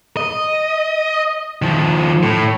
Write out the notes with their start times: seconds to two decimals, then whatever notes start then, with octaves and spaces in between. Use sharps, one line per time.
0.17 D#5
1.62 D#3 F3
2.23 A2